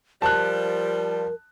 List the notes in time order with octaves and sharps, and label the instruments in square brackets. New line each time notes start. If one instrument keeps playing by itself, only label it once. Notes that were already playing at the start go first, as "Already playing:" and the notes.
[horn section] F3 G3 [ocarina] A#4 [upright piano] A5 F#6